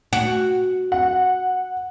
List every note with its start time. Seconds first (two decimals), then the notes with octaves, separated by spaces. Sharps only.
0.13 F#4
0.92 F#5